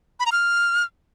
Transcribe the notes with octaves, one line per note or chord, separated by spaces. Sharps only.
B5
A#5
F6